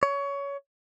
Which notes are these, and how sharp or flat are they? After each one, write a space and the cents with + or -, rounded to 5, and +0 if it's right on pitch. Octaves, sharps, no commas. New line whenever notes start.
C#5 +20